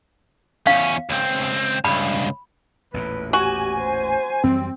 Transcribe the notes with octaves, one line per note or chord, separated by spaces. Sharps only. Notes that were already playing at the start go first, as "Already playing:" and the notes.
E2 C#4 F5
C#2 C4
C#2 G2 B5
A1 E2 A#2 B4
F#4 G4 G#5
C5
F#2 E3 G3 C4